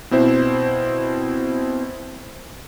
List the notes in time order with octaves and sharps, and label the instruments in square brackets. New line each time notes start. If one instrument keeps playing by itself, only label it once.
[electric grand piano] B2 C4 E4 C5